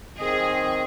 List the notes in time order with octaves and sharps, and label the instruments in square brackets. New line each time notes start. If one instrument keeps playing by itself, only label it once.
[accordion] D#3 C4 D#5 [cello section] G#4